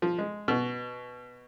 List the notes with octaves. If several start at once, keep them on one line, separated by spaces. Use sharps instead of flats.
F3
G#3
B2